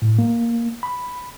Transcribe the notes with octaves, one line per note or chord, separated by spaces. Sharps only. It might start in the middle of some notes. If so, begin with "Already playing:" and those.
A2
A#3
B5